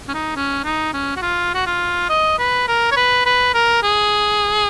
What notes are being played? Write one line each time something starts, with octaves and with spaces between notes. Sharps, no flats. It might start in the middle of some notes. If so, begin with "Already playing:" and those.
C#4
D#4
C#4
D#4
C#4
F#4
F4
F#4
F4
D#5
B4
A#4
C#5
B4
B4
A#4
G#4